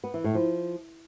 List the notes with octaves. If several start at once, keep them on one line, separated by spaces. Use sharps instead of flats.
B3
E3
A2
F3